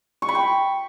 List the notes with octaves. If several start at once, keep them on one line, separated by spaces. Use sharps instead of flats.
C#6
B5
G5